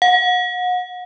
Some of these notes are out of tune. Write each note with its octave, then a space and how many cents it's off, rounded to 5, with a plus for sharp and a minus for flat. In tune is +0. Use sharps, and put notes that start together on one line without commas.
F#5 -40